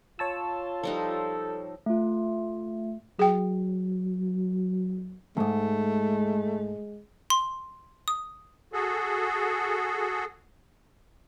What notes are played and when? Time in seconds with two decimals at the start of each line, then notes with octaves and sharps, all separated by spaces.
0.19 F4 C#5 A5 E6
0.83 F3 G3 D#4 A4
1.86 A3 F4
3.19 F#3 G#4 G5
5.37 E2 G#2 G#3 A3
7.30 C6
8.08 D#6
8.73 F#4 G#4 A4